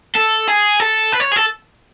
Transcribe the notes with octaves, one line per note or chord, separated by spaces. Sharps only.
A4
G#4
A4
B4
C#5
G#4
A4